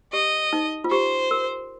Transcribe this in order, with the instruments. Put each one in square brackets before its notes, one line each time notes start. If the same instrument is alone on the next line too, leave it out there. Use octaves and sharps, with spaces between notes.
[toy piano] G4 [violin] D#5
[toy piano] D#4
F4
[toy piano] G4 [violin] C5
[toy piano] A#4